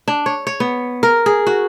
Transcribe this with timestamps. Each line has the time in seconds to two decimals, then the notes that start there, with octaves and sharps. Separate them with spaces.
0.08 D4
0.26 C#5
0.47 C#5
0.60 B3
1.03 A#4
1.26 G#4
1.47 F#4